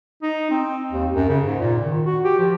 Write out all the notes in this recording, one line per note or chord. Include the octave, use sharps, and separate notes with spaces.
D#4
C4
D#2
F#2
C#3
G#2
A#2
D#3
F#4
G4
F3